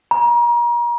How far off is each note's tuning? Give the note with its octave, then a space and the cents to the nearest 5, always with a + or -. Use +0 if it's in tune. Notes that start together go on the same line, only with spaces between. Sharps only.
A#5 +35